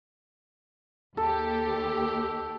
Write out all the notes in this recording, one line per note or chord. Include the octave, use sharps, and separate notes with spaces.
D#2 G4 A4